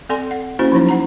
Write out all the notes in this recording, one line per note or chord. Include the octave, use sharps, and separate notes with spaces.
C4 A4 D5 G#5 C6
F#5
A#3 C#4 E4 F#4 C5
F3 F#3 D#4 E4
E4 F#5 A#5